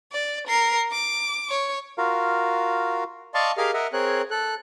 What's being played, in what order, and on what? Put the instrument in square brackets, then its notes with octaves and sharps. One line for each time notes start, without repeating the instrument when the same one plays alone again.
[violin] D5
A#4 C7
D6
C#5
[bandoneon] F4 F#4 A#4 F5
[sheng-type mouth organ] D5 D#5 F5 A5 C6 C#6
G4 G#4 A#4 D#5 F5 F6
A#4 D#5 E5 F#5
C4 G#4 A#4 C#5 F#6
A4 F#6